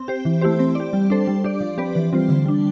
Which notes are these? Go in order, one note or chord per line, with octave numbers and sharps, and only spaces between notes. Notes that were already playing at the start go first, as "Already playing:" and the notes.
Already playing: C4
G4 C5
E3
A3 E4 G4 C5
C4
G4 D5
G3
D4 A4 C5
G3
D4 G4 D5
F3
C4 G4 B4 D5
E3
G3 C4 F4 C5
D3
G3 D4